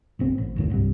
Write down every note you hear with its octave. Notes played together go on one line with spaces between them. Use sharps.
F#1 B1 C4
A1
F#1 D#2 A2
D1 C2 G2